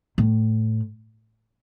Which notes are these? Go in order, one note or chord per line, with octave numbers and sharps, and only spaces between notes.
A2